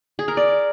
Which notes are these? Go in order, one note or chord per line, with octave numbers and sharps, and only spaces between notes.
G#4
A#4
D5